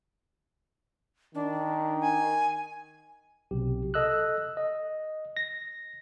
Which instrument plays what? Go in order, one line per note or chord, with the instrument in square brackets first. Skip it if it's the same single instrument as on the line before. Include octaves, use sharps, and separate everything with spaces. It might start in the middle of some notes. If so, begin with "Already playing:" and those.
[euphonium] D#3 [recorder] D4
[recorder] G#5
[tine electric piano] B1 C3 G4
A4 D#5 E6 F#6
D#5
A#6